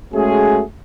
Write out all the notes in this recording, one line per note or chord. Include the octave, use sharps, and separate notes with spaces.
G#3 A3 C#4 F#4 G#4